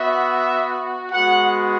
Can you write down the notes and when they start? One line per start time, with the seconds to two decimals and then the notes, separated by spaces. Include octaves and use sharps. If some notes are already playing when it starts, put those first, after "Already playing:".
Already playing: B3 F#4 E5
1.11 G#3 B3 F#4 F#5